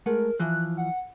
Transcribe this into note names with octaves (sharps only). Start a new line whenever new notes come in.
G#3 A3 A#4 F#5
E3 F3 F#6
F#5